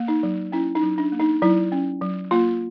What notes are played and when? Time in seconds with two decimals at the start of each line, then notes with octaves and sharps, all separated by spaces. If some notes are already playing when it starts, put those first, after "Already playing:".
Already playing: A#3
0.08 D#4
0.23 F#3
0.52 C#4 E4
0.75 D#4
0.82 F#3
0.98 D4
1.12 A#3
1.19 D#4
1.42 F#3 E4
1.72 C#4
2.01 F#3
2.31 A#3 F4